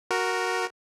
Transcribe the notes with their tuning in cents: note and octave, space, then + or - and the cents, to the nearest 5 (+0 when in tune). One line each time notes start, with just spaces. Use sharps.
F#4 +0 A#4 +0